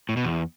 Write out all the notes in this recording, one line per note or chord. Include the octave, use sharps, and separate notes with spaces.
A2
B2
E2